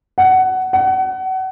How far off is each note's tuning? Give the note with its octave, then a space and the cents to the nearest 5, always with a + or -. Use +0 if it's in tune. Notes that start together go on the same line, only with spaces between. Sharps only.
F#5 +15
F#5 +30